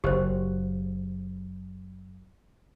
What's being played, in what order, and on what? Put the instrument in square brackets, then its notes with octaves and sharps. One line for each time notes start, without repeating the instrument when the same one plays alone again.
[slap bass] F#1 [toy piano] G4 C5